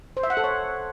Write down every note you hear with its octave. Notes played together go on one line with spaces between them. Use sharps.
C5
E5
F#5
A4
C#5